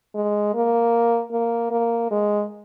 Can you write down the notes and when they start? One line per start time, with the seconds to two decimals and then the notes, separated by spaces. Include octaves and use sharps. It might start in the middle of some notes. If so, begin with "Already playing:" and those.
0.15 G#3
0.54 A#3
1.32 A#3
1.72 A#3
2.11 G#3